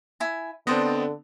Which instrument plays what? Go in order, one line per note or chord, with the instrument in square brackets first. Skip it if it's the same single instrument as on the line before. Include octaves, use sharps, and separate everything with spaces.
[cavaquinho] E4 G#5
[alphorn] D3 [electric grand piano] B3 C4 D4 [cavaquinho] C5 D5 D#5